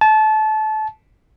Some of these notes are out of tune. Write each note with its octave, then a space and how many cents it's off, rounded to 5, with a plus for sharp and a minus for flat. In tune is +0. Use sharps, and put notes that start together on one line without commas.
A5 -25